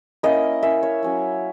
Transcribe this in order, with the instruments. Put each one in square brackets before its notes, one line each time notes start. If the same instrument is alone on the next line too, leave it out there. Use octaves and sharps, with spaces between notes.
[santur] A#3 C#4 E4 D#5
A#3 C#4 E4 E5
C#5
F#3 C#4 E4